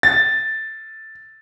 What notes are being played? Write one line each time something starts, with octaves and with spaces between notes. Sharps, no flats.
A6